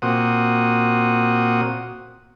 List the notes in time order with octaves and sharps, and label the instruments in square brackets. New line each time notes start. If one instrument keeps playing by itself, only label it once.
[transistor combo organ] A#2 C4 F#4 D#6